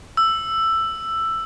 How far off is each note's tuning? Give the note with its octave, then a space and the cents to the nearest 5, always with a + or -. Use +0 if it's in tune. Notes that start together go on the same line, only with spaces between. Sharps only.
E6 +10